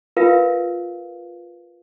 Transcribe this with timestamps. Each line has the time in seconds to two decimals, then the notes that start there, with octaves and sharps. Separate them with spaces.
0.17 F4 G4 A#4 B4 E5 F5